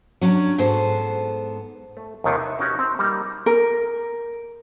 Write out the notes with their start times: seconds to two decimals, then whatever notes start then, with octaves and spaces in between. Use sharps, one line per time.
0.21 F#3 C#4 D4
0.58 G#2 B3 A4 C5
1.97 A3
2.24 D#2 C3 D#3 E3 G#3
2.39 B4 E5
2.59 C#4 D#4 F#4 G4
2.79 C4
2.99 G3 A#3 D#4
3.46 A#4